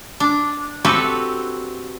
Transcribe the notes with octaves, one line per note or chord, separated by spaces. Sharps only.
D4
C4 F#4 G4 A4 B4